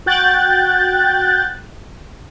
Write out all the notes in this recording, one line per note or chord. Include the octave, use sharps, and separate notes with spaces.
F#4 G5 F#6 G6 A6